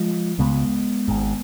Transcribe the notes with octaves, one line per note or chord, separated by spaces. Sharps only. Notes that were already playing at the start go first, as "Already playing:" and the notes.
Already playing: F3 G#3
C#2 C#3 G#3 B3
G#1 G#2